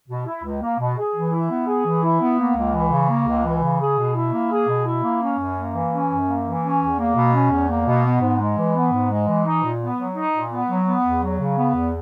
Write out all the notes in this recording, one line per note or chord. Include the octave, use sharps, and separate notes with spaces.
B2
E4
C#2
A#3
B2
G#4
E3
E4
B3
G#4
E3
E4
B3
A#3
C#2
E3
C#3
A#3
C#2
E3
C#3
G#4
B2
E4
A#3
G#4
B2
E4
A#3
C#4
F#2
A#3
E3
C#4
F#2
A#3
E3
C#4
E2
A#3
B2
C#4
E2
A#3
B2
B3
G#2
G#3
E3
B3
G#2
G#3
E3
D#4
A#2
B3
F#3
D#4
A#2
B3
F#3
B3
E2
F#3
C#3
B3
E2